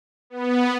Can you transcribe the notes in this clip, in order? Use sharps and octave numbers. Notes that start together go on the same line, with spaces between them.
B3